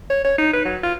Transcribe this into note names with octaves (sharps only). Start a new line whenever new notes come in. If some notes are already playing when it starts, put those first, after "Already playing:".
C#5
C#5
D#4
B4
F#3
F4